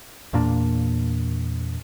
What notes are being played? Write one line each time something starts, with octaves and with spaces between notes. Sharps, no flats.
E2 A#2 A#3 D4